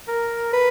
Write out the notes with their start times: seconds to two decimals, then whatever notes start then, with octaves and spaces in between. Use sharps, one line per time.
0.08 A#4
0.53 B4